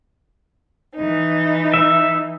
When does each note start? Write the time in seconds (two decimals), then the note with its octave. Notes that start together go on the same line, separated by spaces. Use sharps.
0.94 E3 D#4
1.74 E5